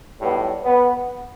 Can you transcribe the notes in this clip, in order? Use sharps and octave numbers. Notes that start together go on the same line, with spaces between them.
B1 A2 G3 B3
B3